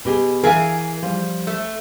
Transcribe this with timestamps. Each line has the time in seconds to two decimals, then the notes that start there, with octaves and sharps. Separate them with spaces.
0.05 B2 G4 G#4
0.44 E3 G#4 A#4 F5 G#5
1.03 F3 G3
1.47 A3